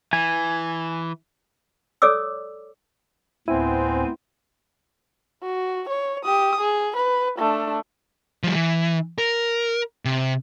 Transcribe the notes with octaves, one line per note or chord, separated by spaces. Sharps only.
E3 G#5
A4 C#5 D5 D6 E6
D2 A2 B3 C4 E4 G#5
F#4
C#5
G4 D#6
G#4
B4
A3 D4
F3 G3
E3
A#4
C3